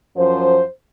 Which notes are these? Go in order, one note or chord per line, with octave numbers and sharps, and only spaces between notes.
F#2 F3 C5